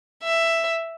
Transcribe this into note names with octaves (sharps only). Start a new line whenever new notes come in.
E5